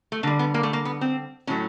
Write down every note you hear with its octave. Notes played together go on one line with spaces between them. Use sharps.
A3
D3 G3 A#3
B3
A#3
A3
A#3
B3
C4
A2 F#3 A3 C#4